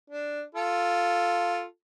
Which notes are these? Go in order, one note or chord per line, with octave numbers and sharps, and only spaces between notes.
D4
F4 A4